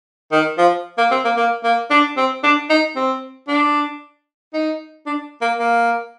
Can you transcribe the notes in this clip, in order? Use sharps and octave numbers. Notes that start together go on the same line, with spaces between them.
D#3
F3
A#3
C4
A#3
A#3
A#3
D4
C4
D4
D#4
C4
D4
D#4
D4
A#3
A#3